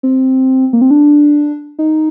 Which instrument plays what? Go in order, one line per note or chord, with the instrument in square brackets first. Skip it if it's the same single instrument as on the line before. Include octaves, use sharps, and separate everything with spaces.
[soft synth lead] C4
A#3
C4
D4
D#4